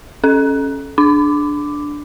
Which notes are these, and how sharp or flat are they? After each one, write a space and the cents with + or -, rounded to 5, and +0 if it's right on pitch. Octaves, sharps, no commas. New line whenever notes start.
C#4 -10 A4 -20
D4 +0 D6 +0